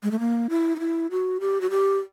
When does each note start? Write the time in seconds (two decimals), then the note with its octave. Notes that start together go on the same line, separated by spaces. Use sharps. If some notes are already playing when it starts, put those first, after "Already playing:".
0.03 G#3
0.11 A3
0.19 A#3
0.50 E4
0.76 D#4
0.80 E4
1.11 F#4
1.40 G4
1.61 F#4
1.70 G4